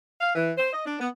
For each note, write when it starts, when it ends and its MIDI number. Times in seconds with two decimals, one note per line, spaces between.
0.21 0.31 77
0.35 0.53 52
0.57 0.72 72
0.72 0.85 75
0.86 0.96 62
1.00 1.08 59